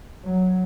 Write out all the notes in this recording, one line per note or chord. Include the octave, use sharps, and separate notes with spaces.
F#3